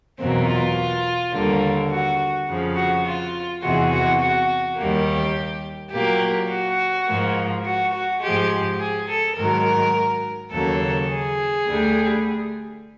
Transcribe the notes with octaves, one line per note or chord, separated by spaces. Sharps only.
E2 B2 F#3 A#3 C4
F4
D#2 D3 G3 A#3
F#4
F2 C#3 F3
F#4
F4
E2 C3 E3 G#3 F#4
F#4
F#4
D#2 D#3 G3 A#3 G4
A#2 F#3 A#3 G4
F#4
G#2 F3 A#3
F#4
F#4
G#2 F3 G#3 G4
G#4
A4
G#2 D#3 F#3 A#4
D#2 C#3 F#3 A#3 A4
G#4
D2 D3 G3